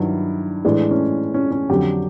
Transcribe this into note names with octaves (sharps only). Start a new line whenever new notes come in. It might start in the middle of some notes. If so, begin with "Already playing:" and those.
Already playing: G2 D#3 F#3 E4
A2 E3 G#3 D4
C#4
C#4
C#4
F2 D3 F#3 G4